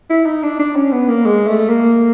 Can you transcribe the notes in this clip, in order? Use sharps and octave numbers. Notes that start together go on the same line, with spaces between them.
E4
D#4
D4
D4
C#4
B3
A#3
G#3
A3
A#3